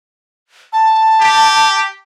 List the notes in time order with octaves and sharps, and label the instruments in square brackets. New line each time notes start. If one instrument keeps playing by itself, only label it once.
[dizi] A5
[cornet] G4